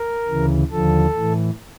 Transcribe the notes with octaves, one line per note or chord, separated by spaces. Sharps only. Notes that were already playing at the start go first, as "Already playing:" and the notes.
Already playing: A#4
D2 C#3 E3
D#2 D3 F3 A4
A2 E3